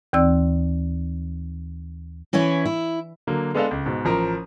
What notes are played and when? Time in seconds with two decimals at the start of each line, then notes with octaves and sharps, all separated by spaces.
0.13 D#2 E3 C4 D5 E6
2.33 E3 C#4 E4 C#5
2.66 E4
3.27 D3 F#3 A#3
3.55 G#3 B3 D4 A4 D#5 F5
3.71 C#2
3.86 G#2 B2
4.05 A1 F3 A#4 A#5